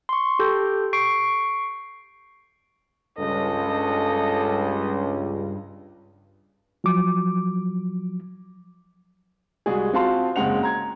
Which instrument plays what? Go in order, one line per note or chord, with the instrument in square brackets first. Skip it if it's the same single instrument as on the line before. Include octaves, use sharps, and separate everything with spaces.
[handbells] C6 C#6
G4 A4 G6
C#6 C7 D7
[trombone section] C#2 [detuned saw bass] G2 [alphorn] A4 [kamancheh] D#5
[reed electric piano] F3 F#3 D6
[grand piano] C2 G#3 F#4 G#4
C4 F4 F#4 F5 A5 C6
F#1 G#2 G#3 C4 F#5 F7
A#5 G#6